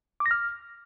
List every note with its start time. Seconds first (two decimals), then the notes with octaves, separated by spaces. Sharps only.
0.20 D6
0.26 A#6
0.31 F6